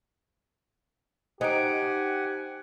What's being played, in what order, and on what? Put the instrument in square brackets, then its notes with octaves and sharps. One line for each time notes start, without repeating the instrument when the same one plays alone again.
[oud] D#4 [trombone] G4 [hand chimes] C5 D7 [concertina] F#5 G#5